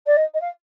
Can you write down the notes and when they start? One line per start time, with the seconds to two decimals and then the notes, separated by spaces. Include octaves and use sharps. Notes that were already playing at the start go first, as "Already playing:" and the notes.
0.06 D5
0.16 D#5
0.34 D#5
0.41 F5